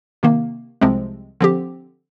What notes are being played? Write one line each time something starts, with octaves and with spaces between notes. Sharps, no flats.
C3 D#3 A#3
C2 C3 F3 G#3 C4
D3 F3 C4 G4